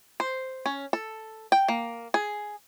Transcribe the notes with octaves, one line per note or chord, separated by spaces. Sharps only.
C5
C#4
A4
G5
A#3
G#4